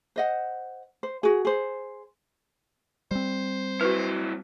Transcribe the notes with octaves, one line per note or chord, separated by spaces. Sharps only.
C5 D#5 F#5
C5
F#4 G#4
G#4 C5
G3 C4 C5
F#3 E4 F#4 B4